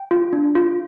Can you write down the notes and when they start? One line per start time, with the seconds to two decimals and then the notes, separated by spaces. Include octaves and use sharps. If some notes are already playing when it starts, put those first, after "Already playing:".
Already playing: G5
0.11 F4
0.33 D4
0.55 F4